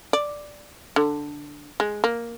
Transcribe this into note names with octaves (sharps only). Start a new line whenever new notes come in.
D5
D3
G#3
A#3